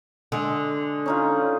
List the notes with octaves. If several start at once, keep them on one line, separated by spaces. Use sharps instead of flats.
D3 G#3
C#4 D#4 F4